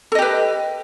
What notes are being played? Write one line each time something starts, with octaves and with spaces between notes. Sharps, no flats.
G4 A4 B4 D#5